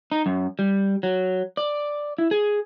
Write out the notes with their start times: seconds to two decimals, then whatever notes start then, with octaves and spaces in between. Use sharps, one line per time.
0.12 D#4
0.26 F#2
0.59 G3
1.03 F#3
1.57 D5
2.18 E4
2.31 G#4